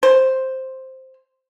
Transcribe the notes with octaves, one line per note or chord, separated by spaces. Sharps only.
C5